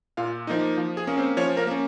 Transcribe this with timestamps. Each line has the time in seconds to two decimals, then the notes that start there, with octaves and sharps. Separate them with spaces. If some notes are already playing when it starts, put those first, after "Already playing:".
0.17 A#2 F4 F5
0.47 F3 A#3 D#4
0.78 F3
0.97 G#4
1.07 A#3 C#4
1.17 C4 C5
1.37 F3 C#4 C#5
1.57 A#3 A#4
1.67 A#3 C#4